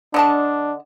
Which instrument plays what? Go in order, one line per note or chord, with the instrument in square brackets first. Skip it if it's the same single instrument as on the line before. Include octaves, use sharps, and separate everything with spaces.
[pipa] D3 D#5 A5 [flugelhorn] D4